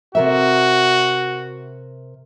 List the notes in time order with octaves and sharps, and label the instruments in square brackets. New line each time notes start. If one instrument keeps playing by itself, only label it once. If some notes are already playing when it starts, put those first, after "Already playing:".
[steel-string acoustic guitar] C3 A#4 E5 [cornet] F#4